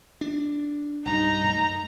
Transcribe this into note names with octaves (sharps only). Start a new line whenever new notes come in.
D4
B1 G2 G3 D#4 A#5
F#2 A3